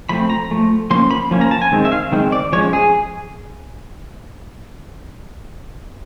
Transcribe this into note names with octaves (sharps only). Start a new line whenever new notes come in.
F3 A3 C4 B5
A#5
F3 A3
F3 A#3 C#4 C6
B5
F3 A#3 C#4
A#5
A5
G#5
D#3 G#3 C4
E5
F5
D#3 G#3 C4
D5
F3 G#3 C#4 C#5
G#4